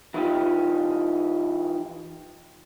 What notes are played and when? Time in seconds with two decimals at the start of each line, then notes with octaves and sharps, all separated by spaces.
0.14 E3 D#4 F4 G4